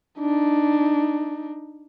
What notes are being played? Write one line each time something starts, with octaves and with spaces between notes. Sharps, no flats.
D4 D#4